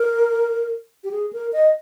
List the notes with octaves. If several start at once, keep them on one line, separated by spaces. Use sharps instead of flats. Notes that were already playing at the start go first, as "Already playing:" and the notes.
Already playing: A#4
G4
G#4
A#4
D#5